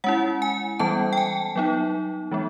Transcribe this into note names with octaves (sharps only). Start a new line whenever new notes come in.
G#3 C#4 E4 F#5
G#5
E3 G3 B3 A5
G5
G#5
F#3 B3 D#4
E3 G#3 B3